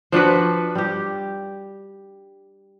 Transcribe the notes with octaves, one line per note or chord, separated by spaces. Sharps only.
F3 D4 F#4 B4
G3 G4